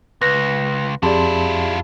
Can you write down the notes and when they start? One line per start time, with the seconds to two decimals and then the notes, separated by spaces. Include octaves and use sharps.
0.21 C#2 B4 F#6 A#6
1.03 F2 E4 F4 G4 G#4 D5 A5 C6